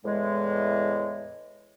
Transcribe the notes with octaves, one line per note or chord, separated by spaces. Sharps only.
E2 A2 G#3